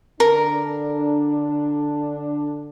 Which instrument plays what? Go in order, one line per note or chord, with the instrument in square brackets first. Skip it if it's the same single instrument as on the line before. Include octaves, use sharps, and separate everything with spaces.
[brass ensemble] D3 D4 [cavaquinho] A#4